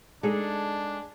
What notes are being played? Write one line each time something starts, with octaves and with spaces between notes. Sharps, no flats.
G#3 D4 D#4 G#4 A4